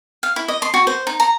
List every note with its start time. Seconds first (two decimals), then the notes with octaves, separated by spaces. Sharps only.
0.23 F5
0.36 E4
0.48 D#5
0.62 C6
0.74 F#4
0.87 C5
1.07 D#4
1.20 A#5